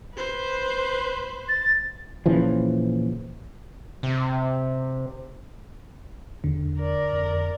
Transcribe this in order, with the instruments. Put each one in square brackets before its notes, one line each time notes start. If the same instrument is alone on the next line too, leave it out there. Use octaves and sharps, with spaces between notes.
[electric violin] B4 C5
[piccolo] A6
[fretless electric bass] A#2 C#3 E3 F3
[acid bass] C3
[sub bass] E2 [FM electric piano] D3
[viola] A#4 D5
[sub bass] F2